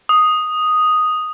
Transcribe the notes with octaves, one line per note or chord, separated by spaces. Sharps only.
D#6